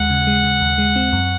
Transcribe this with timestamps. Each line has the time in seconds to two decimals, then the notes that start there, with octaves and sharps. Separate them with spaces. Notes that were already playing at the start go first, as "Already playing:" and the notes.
Already playing: D#2 G#3 F#5
0.10 C#3
0.27 G#3
0.44 C#3
0.61 D#2
0.78 G#3
0.96 C4
1.13 F#2